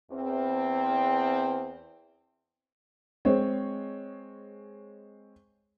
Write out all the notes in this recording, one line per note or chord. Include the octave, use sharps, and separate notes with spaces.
E2 C4
G#3 C4 C#5